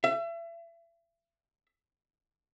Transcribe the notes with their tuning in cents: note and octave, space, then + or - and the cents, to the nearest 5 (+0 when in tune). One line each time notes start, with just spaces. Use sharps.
E5 +35